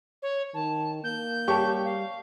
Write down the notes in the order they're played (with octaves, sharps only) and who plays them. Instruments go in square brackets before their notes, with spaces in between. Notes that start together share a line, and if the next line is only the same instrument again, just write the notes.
[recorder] C#5
[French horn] D#3 [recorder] A5
[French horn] A#3 [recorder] G6
[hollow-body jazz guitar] G3 C#5 A5 [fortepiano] G4 C#6
[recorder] F5